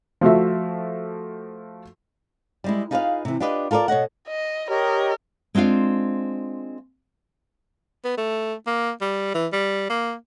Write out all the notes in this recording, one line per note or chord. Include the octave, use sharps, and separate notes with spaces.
F3 A3 F#4 E5
G3 G#3 E4
D#4 F4 G#4 B4 D5 F5
C3 E3
D4 F4 G4 B4 D#5
F4 A4 A#4 C#5 D5
B2 C#5 D#5 F#5
D#5
G4 A#4 C#5 D#5
G#3 C4 D4 F4 F5
B3
A3
A#3
G3
E3
G3
A#3